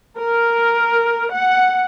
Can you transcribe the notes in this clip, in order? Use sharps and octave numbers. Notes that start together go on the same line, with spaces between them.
A#4
F#5